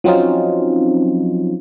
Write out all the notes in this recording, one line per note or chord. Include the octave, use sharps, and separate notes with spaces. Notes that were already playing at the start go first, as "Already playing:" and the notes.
F3 F#3 C4 C#4 D#4 F4